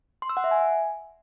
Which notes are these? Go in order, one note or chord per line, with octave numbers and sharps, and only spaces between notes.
C6
E6
F#5
E5
G#5